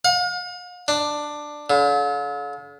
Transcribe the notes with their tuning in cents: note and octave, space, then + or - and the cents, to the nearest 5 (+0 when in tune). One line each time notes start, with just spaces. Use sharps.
F5 +45
D4 +10
D3 -45